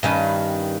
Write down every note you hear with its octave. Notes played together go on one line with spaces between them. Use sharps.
G2 D#3 C#4